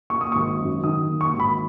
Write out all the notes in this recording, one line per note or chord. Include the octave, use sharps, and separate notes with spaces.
A#3 C#6
D#6
G#1 C#6
F#2
D#3 D#6
A#3
C#6
G#1
B5